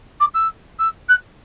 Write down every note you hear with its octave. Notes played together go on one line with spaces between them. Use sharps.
D6
E6
E6
F#6